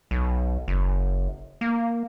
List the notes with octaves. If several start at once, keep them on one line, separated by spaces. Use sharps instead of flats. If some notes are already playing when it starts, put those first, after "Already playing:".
B1
F#1
A#3